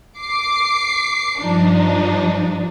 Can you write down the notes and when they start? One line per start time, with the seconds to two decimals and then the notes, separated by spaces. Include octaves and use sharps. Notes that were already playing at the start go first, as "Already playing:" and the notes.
0.19 D6 C7
1.40 G2 F3 D4 D#4